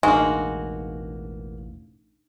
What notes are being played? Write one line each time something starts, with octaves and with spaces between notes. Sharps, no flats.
E1 A1 G#3 A#3 D4 D#4 F#4